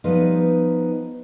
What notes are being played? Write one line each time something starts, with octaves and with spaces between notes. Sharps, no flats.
F3 G3 B3 D#4 B4 D#5